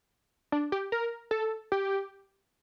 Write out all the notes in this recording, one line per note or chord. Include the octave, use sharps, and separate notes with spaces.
D4
G4
A#4
A4
G4